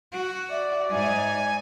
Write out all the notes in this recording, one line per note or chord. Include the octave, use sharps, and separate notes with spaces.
F#4
D5 E5
G#2 D#4 G#5